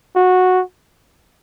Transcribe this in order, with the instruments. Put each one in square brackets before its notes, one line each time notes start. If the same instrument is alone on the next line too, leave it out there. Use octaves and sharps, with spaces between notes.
[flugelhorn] F#4